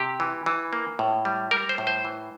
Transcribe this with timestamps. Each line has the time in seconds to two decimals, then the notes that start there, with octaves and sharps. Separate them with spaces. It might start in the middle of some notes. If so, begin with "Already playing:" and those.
Already playing: C3 G4
0.20 E3
0.46 E3
0.73 A#3
0.99 A2
1.25 G3
1.51 G3 A#4
1.69 C5
1.78 A2
1.87 C5
2.05 E3